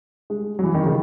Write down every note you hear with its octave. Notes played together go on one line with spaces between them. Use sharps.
G#3
F#3
E3
D#3
C#3